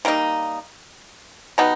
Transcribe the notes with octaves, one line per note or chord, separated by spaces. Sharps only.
G3 A#3 D#4
B2 G3 B3 D#4